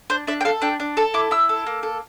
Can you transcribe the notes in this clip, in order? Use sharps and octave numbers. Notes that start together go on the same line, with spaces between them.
D4 C5
D4 E5
G5
A4 F5
D4 G5
D4
A4 A5
E4 D6
E4 E6
A4
A#3
A4